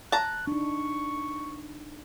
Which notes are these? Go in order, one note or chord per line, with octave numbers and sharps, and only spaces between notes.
A5 A#5 F#6
D4 D#4 C#6